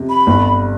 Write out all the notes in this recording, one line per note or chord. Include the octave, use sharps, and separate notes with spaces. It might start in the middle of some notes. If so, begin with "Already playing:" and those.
Already playing: F2 C3
B5
G1